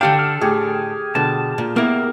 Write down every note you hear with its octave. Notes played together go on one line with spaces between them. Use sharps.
D3 D4 G4 A4 F5 G5
F6
A2 G4 G#4
B2 D3 A5
A#2
A#3 B3 E4 A#4